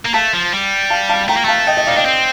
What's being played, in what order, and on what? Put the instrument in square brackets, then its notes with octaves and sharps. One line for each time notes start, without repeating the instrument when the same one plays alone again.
[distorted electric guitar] A#3
[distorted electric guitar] A3 [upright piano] F5 A5
[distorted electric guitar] F3
G3
[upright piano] F5 A5
F5 A5
[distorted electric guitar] A3 [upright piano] G5 A#5
[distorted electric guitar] A#3
[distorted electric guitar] A3 [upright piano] F5 A5
[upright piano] D#5 G5
D#5 G5
[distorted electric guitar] D#4 [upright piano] D5 F5
[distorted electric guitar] D4 [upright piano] D#5 G5
[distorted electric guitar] C4